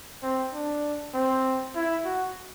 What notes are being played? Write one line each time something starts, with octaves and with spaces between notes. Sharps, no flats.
C4
D4
C4
E4
F#4